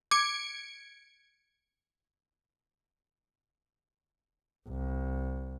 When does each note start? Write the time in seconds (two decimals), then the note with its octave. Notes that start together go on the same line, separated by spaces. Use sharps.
0.11 D6 G#6 C#7 D7
4.69 C2